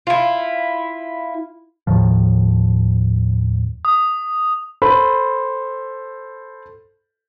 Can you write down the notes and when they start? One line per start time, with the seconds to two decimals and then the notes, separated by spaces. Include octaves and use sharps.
0.07 E4 F4
1.87 D#2 A2 D#3 F3
3.85 D#6
4.82 A4 C5 B5